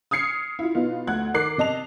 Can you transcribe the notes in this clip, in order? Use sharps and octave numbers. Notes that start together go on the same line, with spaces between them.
D#6 F6 G#6 C7 C#7
E4 F4
B2 B3 D#4 F4
D2 F#5 F#6 G#6
D#3 A#4 D6 F#6 C7
C3 D#5 A5 F7